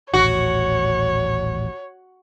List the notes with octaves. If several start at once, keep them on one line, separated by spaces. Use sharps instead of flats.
D#1 A1 F#4 C#5